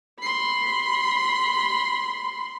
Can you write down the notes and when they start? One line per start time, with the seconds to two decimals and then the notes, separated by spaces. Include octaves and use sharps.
0.20 B5 C6